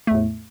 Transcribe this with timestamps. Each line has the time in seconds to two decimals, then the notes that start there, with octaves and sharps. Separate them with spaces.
0.07 A3
0.11 E2
0.14 A2